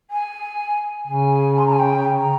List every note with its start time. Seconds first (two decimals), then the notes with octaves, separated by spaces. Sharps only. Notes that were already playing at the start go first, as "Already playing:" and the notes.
0.11 G#5
1.07 C#3 G#5
1.58 C6
1.66 A#5
1.73 G#5
1.79 G5
2.16 A#5